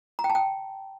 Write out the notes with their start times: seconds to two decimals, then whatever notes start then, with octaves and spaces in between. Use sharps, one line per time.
0.19 A#5
0.24 G5
0.30 A5
0.35 G5